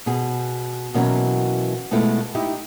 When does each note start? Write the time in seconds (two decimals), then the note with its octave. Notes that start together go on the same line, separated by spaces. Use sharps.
0.06 B2 G#4
0.94 B2 E3 F#3 A#3 C#4 F#4
1.91 B2 G#3 A3 B3 E4 F4
2.35 D#4 E4 G4